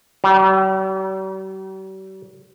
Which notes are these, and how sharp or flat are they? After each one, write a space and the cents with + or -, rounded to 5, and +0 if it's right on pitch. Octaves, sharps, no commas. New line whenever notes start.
G3 -45